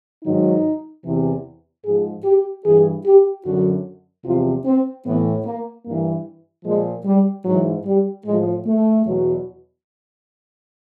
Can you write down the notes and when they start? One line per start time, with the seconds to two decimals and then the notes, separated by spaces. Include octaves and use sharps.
0.24 G#2 D#3 F#3 D#4
1.04 E2 C3 E3
1.84 G#2 F3 G#4
2.24 G4
2.64 G2 E3 G#4
3.05 G4
3.44 F#2 D3 F#3 F#4
4.24 E2 C3 F3 F4
4.65 C4
5.05 A2 E3 B3
5.45 A#3
5.85 G2 E3 A#3
6.65 A#2 F3 G#3
7.05 G3
7.45 G#2 E3 F#3
7.85 G3
8.25 A2 F3 G#3
8.65 A3
9.05 E2 B2 F#3